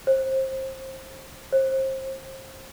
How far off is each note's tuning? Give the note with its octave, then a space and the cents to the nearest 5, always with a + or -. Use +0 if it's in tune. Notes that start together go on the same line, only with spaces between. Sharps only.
C5 +25
C5 +30